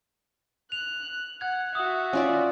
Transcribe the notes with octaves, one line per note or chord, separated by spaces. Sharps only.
F#6 F7
F#5 F#6 G#6
F#4 E5 D#6
C#4 F4 D5